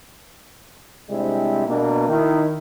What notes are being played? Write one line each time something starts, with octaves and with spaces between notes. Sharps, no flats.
C3 G3 G#3 C4 D4 E4
B2 A#3 D4
D#3 E4